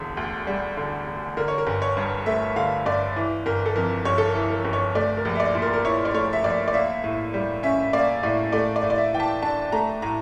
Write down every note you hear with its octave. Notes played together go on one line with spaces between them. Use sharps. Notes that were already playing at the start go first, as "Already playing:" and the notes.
Already playing: E1 D3
D2
G3
D3
E1
D3 A#4
C#5
A#4
G1
C#5
G2
A3 E5
D3 F5
G1 D5
E3
G1 A#4
A4
F2 A#4
G1 C#5
A4
A#4
E3
A#4
G1
C#5
A3 D5
A#4
A#1
E5
D5
A#2
A#4
A#4
E4 C#5
D5
A3 C#5
E5
A#1 D5
D5
A#3 E5
A2
G3
C#4 E5
A#3 D5
A2 D5
A3 D5
D5
A2
D5
E5
E3 G5
A5
D4 A5
A3 A#5
A2 A#5